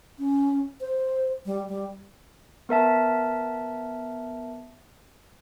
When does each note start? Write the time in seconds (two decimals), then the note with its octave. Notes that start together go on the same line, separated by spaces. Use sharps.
0.19 C#4
0.81 C5
1.46 G3
1.68 G3
2.69 B3 A#4 E5 A5